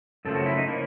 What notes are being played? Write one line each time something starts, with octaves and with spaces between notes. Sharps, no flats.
F#2 C#3 F3 A3 A4
F#4
E4
D#4
C#3 F3 A#3 E4